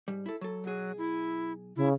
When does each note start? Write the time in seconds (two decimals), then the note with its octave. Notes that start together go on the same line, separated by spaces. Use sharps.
0.08 G#2 G3
0.26 E4 A4
0.41 F#3 A4
0.64 B1 F#3 G#4
0.98 E4
1.76 C#3 E4